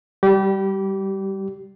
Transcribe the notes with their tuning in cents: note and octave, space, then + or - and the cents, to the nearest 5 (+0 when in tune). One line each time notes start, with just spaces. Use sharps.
G3 +0 G4 -25